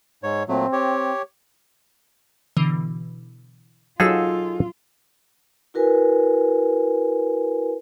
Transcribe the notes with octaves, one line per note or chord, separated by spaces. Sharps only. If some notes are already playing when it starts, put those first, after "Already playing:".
G#2 C#5
A#2 F#3 A3 C4
G4 C#5
B2 D3 E3
F#3 D#4 F4 G#4 A4 F5 E6
E4 F#4 A#4 B4 G#5